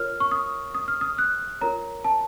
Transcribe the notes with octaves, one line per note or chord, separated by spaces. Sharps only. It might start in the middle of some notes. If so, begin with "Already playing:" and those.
Already playing: F4 A#4 C#5 F6
C#6
D#6
D#6
F6
D#6
F#6
F4 A#4 C#5 A#5
A5